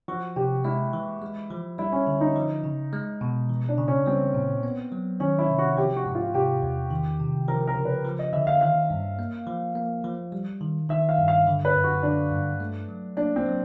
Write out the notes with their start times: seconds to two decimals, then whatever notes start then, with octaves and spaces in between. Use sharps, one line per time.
0.08 F3 F#4
0.36 C3 G4
0.64 G#3 E4
0.93 E3
1.22 G#3
1.50 F3
1.78 G3 E4
1.92 C#4
2.07 D3
2.21 D#4
2.36 F3
2.64 C#3
2.93 G#3
3.21 B2
3.49 E3
3.69 D4
3.78 C#3
3.88 C#4
4.06 G3 C4
4.34 A#2
4.63 B3
4.92 F#3
5.20 D#3 C#4
5.39 E4
5.49 C3
5.58 F#4
5.77 F3 G4
5.96 F#4
6.06 G#2
6.15 F4
6.35 C3 G4
6.63 E2
6.91 D#3
7.20 C3
7.48 F3 A#4
7.67 A#4
7.76 C#3
7.85 B4
8.05 F3
8.19 D#5
8.33 D3 E5
8.47 F5
8.61 D#3 F5
8.90 G2
9.19 A#3
9.47 F3
9.75 A#3
10.04 F3
10.32 G3
10.61 D#3
10.89 D#3 E5
11.09 F5
11.18 G2
11.28 F5
11.47 D3
11.65 B4
11.75 F#2
11.84 F#4
12.03 D3 D4
12.32 G2
12.60 A3
12.88 F#3
13.17 A#3 D4
13.36 C4
13.46 F#3